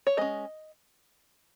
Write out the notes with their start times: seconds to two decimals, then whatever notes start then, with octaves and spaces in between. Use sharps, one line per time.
0.07 C#5
0.17 G#3 C#4 D#5